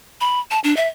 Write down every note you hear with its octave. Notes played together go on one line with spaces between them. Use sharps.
B5
A5
D4
E5